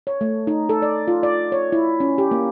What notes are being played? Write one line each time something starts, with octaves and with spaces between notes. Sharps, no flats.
C#5
A3
D#4
A4
D5
F4
D5
C#5
E4
C#4
G4
A#3